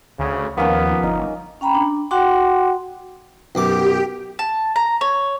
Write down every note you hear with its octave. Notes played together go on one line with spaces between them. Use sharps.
D2 C#3
D#2 F3 A#3 B3 C#4
G1 D#4
C#4 G5 A#5 B5
D4
F#4 F#5 G5 C6 D6
B1 F#2 G4 D6
A5
A#5
C#5